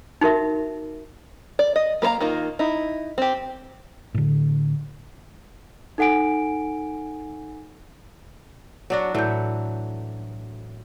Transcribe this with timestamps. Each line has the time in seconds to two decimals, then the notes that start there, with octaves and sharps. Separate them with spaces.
0.21 D#4 F#4 A#4 E5
1.59 D5
1.76 D#5
2.02 A#3 B4 C5 F5 A#5
2.20 D#3 A#3 D#4 F4
2.59 D#4 E4
3.18 C4 G4
4.14 A2 D3
5.98 D#4 A4 F#5 G#5 D7
8.90 F#3 D4 F#4
9.15 A2 E3 F#3 A3 G6